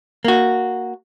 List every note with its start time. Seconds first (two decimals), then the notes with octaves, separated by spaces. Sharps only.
0.25 A#3 F#4